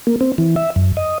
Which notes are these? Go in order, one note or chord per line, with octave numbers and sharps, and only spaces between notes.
A#3
C4
E3
E5
F#2
D#5